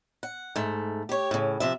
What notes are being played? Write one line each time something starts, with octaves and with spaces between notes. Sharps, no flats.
F#5
G#2 A3
G4 C#5
A2 C#3
C3 F3 E5